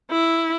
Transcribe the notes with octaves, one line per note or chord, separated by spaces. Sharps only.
E4